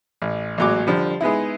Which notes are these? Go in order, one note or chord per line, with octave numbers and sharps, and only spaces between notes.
A1
A1 A#2 F#3 G#3 D6
D3 F3 G3
G#3 B3 D#4 E4